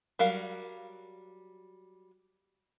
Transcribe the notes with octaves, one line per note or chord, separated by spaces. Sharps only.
F#3 G3 A#4 F5